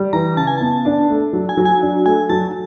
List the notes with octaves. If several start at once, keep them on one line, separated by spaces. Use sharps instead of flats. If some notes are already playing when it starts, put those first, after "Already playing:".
Already playing: G3
E3 A#5
C#3 A5
G#5
B3 A5
D4
A3
F#3
G#5
F#3
G#5
D4
A3 G#5
F#3 A5